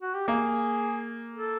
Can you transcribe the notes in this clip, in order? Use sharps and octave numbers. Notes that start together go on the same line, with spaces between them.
F#4
G4
A#3 G#4
A4